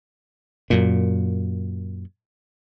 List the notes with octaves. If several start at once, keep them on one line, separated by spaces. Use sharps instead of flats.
F#2 A#2